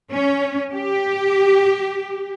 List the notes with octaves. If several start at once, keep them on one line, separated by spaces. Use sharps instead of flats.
C#4
G4